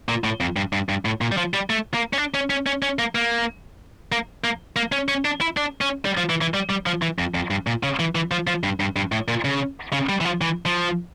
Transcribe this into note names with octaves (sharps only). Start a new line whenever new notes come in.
A#2
A2
F2
G2
G2
G2
A2
A#2
G3
F3
G3
A3
A#3
C#4
D4
C#4
C#4
C#4
C#4
A#3
A#3
A#3
A#3
A#3
C#4
C#4
D4
E4
D4
C#4
G3
F3
E3
E3
G3
G3
F3
E3
F2
F2
G2
A#2
C#3
E3
E3
F3
F3
G2
G2
G2
A2
A#2
C#3
C#3
G3
E3
F3
E3
F3